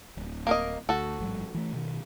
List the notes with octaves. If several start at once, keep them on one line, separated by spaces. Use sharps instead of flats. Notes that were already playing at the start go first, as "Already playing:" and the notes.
D1
A#3 A#4 D#5
D2 F#4 A4
A1 G#2 F#3
E3 A3
B2 D#3